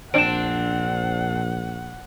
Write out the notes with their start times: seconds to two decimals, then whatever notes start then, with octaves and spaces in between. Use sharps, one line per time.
0.14 A#1 C4 D4 F#5 D7 E7